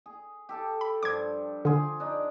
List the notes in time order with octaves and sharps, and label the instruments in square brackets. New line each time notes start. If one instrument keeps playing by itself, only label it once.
[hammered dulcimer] G#4
G4 A4 A5
[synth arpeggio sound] B5
[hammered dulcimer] G2 F3 [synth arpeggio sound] D6 G#6
[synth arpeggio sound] D3 [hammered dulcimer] F4 G#4
[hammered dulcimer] D4 D#4